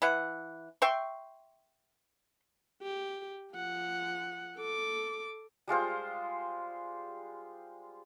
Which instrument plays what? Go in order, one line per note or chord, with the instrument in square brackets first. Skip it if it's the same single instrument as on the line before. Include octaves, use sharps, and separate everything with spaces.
[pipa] E3 E4 F#5
E5 G5 C6 C#6
[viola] G4
F3 F#5
A4 D6
[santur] G3 G#3 F4 C5